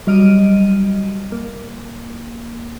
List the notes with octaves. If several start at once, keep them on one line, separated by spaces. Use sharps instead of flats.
F#3 G3 D#5 F6 D7 D#7
A#3